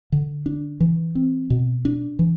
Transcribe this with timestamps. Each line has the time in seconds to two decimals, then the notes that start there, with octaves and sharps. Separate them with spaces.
0.12 D3
0.46 D4
0.80 E3
1.15 C4
1.50 B2
1.85 D4
2.19 E3